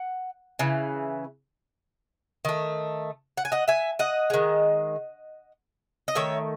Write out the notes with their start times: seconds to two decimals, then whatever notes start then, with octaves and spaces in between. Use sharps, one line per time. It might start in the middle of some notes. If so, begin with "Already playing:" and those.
Already playing: F#5
0.59 C#3 E3
2.45 D#3 A3
3.38 F#5
3.45 G#5
3.52 D#5 F#5
3.68 E5 G#5
3.99 D#5 F#5
4.30 D#3 G#3
6.08 D#5
6.15 D#3 A3 C#5 E5